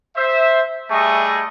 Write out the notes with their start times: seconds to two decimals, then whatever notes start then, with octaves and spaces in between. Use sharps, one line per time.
0.16 C5 E5
0.90 G3 A3 G#4 D#5 E5 C#6